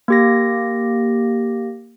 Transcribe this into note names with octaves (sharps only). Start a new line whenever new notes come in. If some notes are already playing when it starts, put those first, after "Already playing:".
A#3 G4 A#6